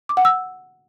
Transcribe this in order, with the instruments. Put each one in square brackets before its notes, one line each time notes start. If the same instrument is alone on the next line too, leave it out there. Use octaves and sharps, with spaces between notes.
[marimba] D6
F#5
E6